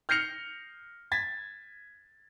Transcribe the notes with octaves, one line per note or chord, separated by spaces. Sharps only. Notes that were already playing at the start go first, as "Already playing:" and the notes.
F6 G6 A#6 C7 C#7 F7
G#6 A6 B6